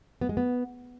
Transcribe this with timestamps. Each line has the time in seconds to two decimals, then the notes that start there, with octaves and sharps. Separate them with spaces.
0.21 B3
0.29 G#3
0.37 B3